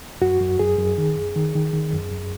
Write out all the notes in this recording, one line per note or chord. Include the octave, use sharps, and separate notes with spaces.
F#2 F#4
F#2
F#2 G#4
F#2
D#3
F#2
D#3
D#3
D#3
F#2
F#2